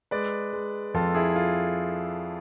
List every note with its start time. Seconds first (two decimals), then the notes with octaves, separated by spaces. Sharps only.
0.11 G#3 B4 D5
0.53 G#3
0.94 F2 F4 A4
1.15 E4 G#4
1.36 F4